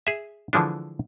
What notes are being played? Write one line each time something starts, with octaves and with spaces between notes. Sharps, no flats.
G#4 E5
D3 E3 F3 G#3 D4